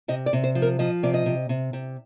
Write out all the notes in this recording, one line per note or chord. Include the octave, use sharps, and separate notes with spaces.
C3 D#5
D5
C3
C5
F3
A#4
F3 D#5
C3 D5
D#5
C3
C3
C3